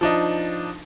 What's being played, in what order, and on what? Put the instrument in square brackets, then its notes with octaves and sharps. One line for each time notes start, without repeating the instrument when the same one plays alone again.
[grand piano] F3 D4 D#4